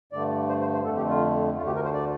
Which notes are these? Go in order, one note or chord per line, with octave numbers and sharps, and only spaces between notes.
G2 D3 A3 D5
C5
C5
C5
F2 D3 A3 A4
G4
F4
D2 D3 A3 F4
G4
A#4
C5
D5